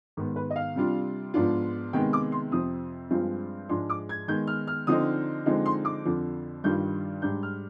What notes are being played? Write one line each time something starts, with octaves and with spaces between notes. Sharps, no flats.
G#2 D#3 B3
B4
D#5
F5
C3 G3 D4 F4
G#2 F3 B3 D4 F4
C3 D#3 G#3 B3 G5
D6
C6
F2 C3 F3 C4 D#6
G2 F3 G#3 C4 F4
G#2 F3 G#3 D4 C6
D6
G#6
D#3 G#3 B3 G6
F6
F6
D3 F3 C4 D#4 D#6
D3 F3 G#3 C4 D#4
C6
D6
F2 D3 F3
G2 D#3 G3 D4 F4 G6
G#2 G3 D4 G6
F6